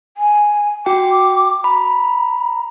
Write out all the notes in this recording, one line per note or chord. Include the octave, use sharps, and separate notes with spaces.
G#5
F#4 G5 D6
A#5 B5